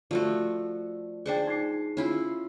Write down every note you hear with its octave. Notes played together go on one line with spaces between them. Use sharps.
F3 A3 F#4 D5
D4 G#4 C5 D5 G5 C#6
D#4 G#4 C7
C#4 E4 F4